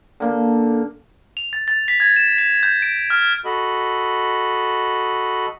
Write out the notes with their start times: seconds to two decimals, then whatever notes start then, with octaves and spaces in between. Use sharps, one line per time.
0.20 D3 A#3
1.37 F7
1.53 A6
1.68 A6
1.88 B6
2.00 G#6
2.16 E7
2.38 B6
2.63 G6
2.82 D7
3.10 F6
3.45 F#4 A4 D#5 B5